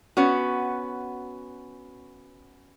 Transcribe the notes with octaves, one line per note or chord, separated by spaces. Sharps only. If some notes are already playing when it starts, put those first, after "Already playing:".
B3 C#4 F#4